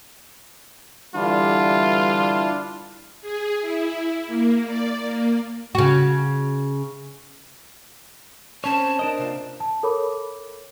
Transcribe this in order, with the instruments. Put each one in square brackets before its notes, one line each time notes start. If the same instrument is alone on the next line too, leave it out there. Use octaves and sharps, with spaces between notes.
[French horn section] D3 E3 G3 [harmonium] D4 E4 [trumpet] F4
[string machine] G#4
E4
A#3
D5
A#3
[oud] C#3 F#4
[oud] C4 C5 [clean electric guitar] C#4 C#5 [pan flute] A5
[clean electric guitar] D4 A#4 D#5
[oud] C3 A#3 F4
[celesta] A5
A4 A#4 C#5 B5 D6